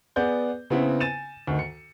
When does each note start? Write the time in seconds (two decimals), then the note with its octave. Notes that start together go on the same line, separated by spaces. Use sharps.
0.16 B3 G#4 D5 G6
0.70 C#3 B3 C4 E4
1.00 G#5 A6 D#7 E7
1.47 D2 D#3
1.59 C#7